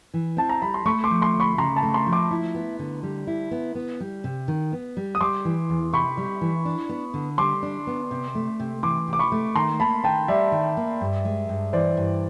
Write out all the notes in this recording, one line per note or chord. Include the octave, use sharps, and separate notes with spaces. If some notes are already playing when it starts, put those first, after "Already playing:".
E3
C4 A5
A#5
G3 B5
C6
A3 B5 C#6
C6 D6
F3
C6 D6
D2
B5 C#6
C#3 A#5 C6
A5 B5
A3
A#5 C6
F3
C6 D6
E4
B3
D3
G3
E4
B3
B3
G3
C3
D#3
B3
G3
D#6
G3 C6 D6
E3
E2
C3 B5 C#6
G3
E3
D4
B3
D3
G3 C6 D6
D4
B3
C3
A3
C3
E3 C6 D6
C3
D6
B5 C#6
A3
D#3 A#5 C6
A#3 A5 B5
D#3 G5 A5
G3 D5 E5
D#3
A#3
G2
G#3
G2
E3 C5 D5
G2